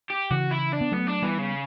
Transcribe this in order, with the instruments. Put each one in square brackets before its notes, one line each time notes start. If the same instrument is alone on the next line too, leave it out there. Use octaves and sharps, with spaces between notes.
[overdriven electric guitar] G4
[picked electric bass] C#3 E3 [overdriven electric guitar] F#4
[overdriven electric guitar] E4
D4
[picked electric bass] B3
[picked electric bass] F#3 A3 [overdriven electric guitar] B3
[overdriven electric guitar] D4
[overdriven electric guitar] E3 [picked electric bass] G3 B3
[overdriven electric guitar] C#3